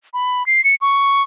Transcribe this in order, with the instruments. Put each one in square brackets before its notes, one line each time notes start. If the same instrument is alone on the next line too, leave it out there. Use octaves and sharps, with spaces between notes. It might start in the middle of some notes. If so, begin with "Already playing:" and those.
[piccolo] B5
C7
C#7
C#6